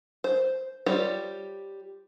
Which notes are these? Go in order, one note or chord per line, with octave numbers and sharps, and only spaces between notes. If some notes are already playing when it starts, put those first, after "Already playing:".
C5
G3 F4 G4 C5 C#5